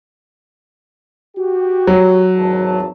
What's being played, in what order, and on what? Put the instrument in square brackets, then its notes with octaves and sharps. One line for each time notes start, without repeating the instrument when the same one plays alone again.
[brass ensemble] F#4 G4
[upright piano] F#3
[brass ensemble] G#1 E2 A5